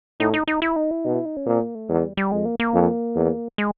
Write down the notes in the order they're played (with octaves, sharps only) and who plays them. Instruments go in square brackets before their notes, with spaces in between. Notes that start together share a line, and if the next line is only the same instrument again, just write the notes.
[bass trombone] A2 [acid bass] D#4
[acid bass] D#4
D#4
E4
D#4
E4
[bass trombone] B2 [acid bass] D#4
[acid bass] E4
D#4
C#4
[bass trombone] A#2 [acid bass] C4
[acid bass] A#3
A3
[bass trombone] E2 [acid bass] G#3
[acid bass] G3
G3
[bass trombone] F2 [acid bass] G#3
[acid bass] A#3
A#3
[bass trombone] F2
E2
[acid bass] G#3